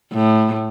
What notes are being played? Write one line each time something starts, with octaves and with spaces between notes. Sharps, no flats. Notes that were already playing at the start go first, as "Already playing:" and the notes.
A2